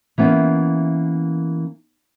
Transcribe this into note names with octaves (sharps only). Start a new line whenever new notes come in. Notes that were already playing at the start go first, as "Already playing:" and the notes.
E3 A#3 B3 C#4